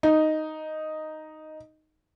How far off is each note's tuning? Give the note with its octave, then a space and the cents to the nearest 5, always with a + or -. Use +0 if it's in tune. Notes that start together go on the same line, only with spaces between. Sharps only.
D#4 +0